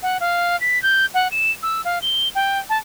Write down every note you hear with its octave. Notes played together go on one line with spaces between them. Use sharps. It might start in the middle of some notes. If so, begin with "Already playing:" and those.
F#5
F5
B6
G6
F#5
E7
E6
F5
G7
G5
A5